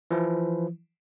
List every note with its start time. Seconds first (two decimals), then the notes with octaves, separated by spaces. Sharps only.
0.11 E3 F3 E4